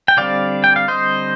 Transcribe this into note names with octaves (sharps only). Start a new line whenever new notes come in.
G5
D3 G3 C4 D5 F5
G5
F5
C5 D#5